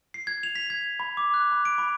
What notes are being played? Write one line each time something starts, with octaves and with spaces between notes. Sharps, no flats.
C7
G#6
F7
B6
G#6
B5
D6
F#6
B5
D7
B5